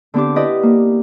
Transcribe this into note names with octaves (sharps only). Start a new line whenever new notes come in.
D3 B3 C4 D4 G4 D6
E4 G4 B4 D5 D#5
A#3